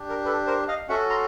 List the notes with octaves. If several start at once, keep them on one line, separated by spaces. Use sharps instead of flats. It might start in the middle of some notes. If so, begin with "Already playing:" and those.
Already playing: D4 G4
A#4
A4 B4
A#4 C5
D#5 F5
C#4 F#4 A4 E5 F#5
A#5 C6